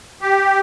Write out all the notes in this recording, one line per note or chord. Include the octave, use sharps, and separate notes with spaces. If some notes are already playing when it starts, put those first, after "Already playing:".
G4